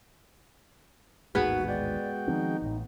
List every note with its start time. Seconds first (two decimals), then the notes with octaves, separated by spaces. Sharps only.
1.35 A1 D#2 G#2 D#3 B3 F#4 G#4 B4
1.68 G#3 F#4 D5 G5
2.28 D#3 F3 C4 D#4
2.62 A1 A2